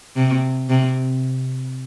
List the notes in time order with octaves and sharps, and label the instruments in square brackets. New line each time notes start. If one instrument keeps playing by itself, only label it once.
[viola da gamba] C3
C3